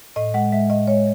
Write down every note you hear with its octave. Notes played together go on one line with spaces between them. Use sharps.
A2 D#5
G#3 F#5
G#3 E5
A2 D#5
G#3 C#5